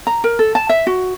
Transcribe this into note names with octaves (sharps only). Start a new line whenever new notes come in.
A#5
A#4
A4
A5
E5
F#4